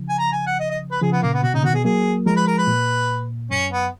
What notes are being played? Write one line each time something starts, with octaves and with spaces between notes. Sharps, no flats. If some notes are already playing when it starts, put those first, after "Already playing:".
Already playing: C#3 F3
G#5
A#5
G#5
F#5
D#5
D#5
B4
C#3 F3 G#4
B3
A#2 C#3 A#3
B3
B2 F#4
A#2 C#3 D#4
B2 D#3 F#4
B2 G#4
F#3 A#3 G#4
F3 G#3 A#4
B4
A#4
B4
A#2
F#2 C#4
B3